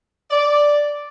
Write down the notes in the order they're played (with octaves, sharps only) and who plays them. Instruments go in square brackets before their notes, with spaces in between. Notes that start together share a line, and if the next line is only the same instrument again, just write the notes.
[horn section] D5